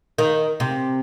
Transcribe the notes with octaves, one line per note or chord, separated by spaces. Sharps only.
D#3
C3